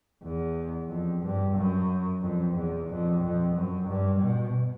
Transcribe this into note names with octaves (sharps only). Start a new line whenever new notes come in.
E2
F2
G2
F#2
F2
E2
F2
F2
F#2
G2
B2